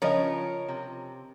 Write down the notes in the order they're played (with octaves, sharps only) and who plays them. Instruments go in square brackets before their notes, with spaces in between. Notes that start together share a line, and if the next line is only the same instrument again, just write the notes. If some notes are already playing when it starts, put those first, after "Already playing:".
[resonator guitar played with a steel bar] C#3 C#4 [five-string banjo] F3 D#5 [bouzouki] F4 A#4 C#5
[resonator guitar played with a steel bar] C3